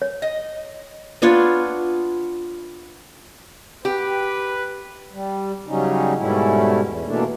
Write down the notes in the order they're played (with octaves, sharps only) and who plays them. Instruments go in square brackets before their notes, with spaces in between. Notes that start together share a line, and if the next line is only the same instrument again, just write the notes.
[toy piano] C#5
[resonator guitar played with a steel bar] D#5
[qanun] B3 D4 F4 C#5
[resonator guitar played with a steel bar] G4 [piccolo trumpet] B4
[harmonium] G3
C#3 F#3 G3 C#4 D#4
G#2 B2 G3 A3 C#4 E4
E2
B2 E3 A3 A#3 D4